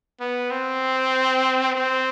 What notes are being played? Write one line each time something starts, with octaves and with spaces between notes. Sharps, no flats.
B3
C4
C4